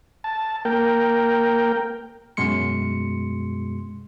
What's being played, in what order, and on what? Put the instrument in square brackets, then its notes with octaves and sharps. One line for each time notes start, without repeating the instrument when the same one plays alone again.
[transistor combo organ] A5
A#3 A#4 G5
[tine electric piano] F#2 B2 G#3 C6 C#7